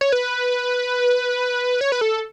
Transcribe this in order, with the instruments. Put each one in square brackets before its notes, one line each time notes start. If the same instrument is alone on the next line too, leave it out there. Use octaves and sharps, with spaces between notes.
[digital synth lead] C#5
B4
C#5
B4
A4